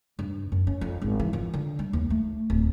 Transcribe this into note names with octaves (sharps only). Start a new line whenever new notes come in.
G2
F#2
C#4
F2
G#1
E3
F3
D3
G3
D#2
A3
D1